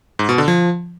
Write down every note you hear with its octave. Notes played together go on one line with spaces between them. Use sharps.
G#2
B2
D3
F3